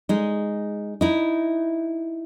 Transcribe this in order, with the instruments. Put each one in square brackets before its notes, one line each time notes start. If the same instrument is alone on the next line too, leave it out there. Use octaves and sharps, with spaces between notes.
[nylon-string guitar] G#3 D#4
D#4 E4